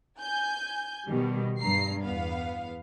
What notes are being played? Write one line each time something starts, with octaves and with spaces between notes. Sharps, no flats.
G#5 G6
B2 D#3 G3
G2 A#5 C7
E2 B3 F5